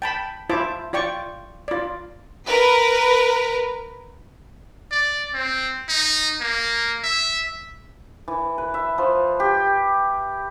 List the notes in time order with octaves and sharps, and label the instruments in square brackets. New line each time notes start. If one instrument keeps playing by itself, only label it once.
[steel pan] G5 A5 B5
E4 F4 C5 E5 A5 D6
F4 D5 G5 C#6
F4 D5
[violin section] A#4 B4
[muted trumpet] D5
C4
D#4
A#3
E5
[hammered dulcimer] E3
B4
E5
F3
G4